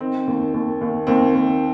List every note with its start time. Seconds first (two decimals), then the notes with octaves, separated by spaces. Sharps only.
0.01 D#3 C4
0.27 D#2
0.54 D#2
0.81 D#2
1.07 D#2 C4
1.35 D#2